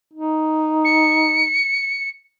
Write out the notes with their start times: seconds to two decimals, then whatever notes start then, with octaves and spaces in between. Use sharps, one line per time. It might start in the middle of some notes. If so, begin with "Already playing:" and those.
0.14 D#4
0.85 C#7